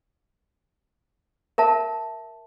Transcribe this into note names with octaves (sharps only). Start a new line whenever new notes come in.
A#4 E5 A5